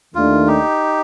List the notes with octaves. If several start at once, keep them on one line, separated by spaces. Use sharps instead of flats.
D#2 D#3 A3 D4 F4
D#4 G4